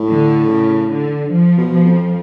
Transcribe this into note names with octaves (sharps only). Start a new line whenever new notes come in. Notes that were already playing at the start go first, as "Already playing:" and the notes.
Already playing: A2
D3
C#3
D3
F3
B2
F3
F2